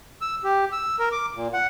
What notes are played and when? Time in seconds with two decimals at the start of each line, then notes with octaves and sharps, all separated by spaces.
0.21 E6
0.44 G4
0.72 E6
0.99 A#4
1.12 D6
1.35 A#2
1.53 F#5